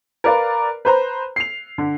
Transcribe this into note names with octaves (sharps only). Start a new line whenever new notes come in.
A#4 B4 D5 F5
B4 C5 A#5
C7 F7
D3